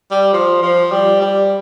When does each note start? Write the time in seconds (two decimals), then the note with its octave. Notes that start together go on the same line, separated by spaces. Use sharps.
0.11 G3
0.33 F3
0.63 F3
0.92 G3
1.21 G3